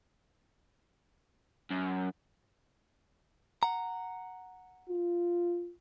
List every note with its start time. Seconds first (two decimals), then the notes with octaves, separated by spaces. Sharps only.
1.70 F#2
3.63 F#5 A#5
4.89 F4